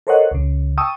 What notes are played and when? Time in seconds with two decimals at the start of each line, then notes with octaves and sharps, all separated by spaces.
0.07 A4 A#4 C5 C#5 D#5 F#5
0.31 C#2 C#3
0.78 G5 A5 C#6 D#6 E6